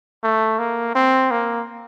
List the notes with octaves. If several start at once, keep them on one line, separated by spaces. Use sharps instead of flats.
A3
A#3
C4
A#3